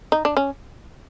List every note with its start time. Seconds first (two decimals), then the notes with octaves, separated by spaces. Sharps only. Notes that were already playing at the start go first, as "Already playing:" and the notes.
0.12 D#4
0.25 D4
0.37 C#4